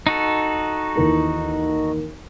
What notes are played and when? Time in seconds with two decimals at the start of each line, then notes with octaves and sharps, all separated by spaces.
0.07 D#4 F#4 A4
0.96 D#2 E3 A#4